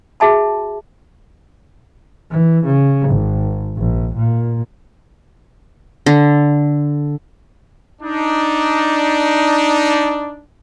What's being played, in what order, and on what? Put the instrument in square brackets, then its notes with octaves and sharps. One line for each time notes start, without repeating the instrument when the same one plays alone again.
[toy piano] F#4 G#4 E5 A5 B5
[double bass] E3
C#3
G#1
A#1
A#2
[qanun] D3
[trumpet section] D4 D#4